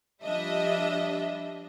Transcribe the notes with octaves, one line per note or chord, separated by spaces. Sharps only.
F3 G3 D4 D#5 E5